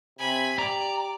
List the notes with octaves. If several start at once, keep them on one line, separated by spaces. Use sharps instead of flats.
C3 G#5 B5
G4 D5 A#5